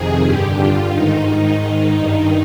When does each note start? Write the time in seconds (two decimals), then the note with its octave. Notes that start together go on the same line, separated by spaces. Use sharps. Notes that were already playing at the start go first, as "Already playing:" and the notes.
Already playing: F2 C3 D#3 G#4
0.25 G2 D3 G4
0.59 G2 D3 F4
0.93 G#2 D#3 D#4
1.28 G#2 D#3 D#4
1.62 G#2 D#3
1.97 G2 D#3